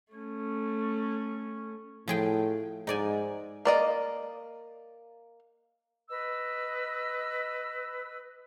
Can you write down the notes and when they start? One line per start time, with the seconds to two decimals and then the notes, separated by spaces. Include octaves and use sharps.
0.13 A3 C#4
2.08 A2 F3 G#4 G5
2.87 G#2 D#4 D5 G#5
3.65 A#3 D5 D#5
6.09 B4 D#5 E6